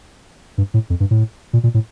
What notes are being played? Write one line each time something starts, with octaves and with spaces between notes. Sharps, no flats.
G2
A2
F2
G2
A2
A#2
A#2
A2